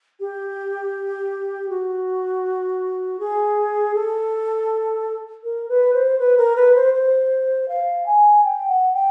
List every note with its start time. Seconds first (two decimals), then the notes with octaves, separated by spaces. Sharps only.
0.20 G4
1.69 F#4
3.19 G#4
3.94 A4
5.44 A#4
5.69 B4
5.93 C5
6.19 B4
6.37 A#4
6.56 B4
6.75 C5
6.94 C5
7.68 F5
8.06 G#5
8.44 G5
8.68 F#5
8.94 G5